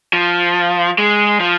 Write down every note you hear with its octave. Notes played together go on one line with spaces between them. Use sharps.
F3
G#3
F3